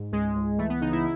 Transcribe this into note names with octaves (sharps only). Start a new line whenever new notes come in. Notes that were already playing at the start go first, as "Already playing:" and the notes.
Already playing: G#2
C#2 G#3
C#2
E3 A3
B3
C#3 D#4
E4